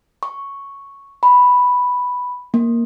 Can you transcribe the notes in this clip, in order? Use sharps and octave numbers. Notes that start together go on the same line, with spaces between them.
C#6
B5
A#3